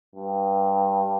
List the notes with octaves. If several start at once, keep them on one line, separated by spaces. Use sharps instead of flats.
G2